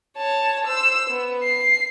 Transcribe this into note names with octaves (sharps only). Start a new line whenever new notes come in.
C#5 A5
C5 E6
B3
C7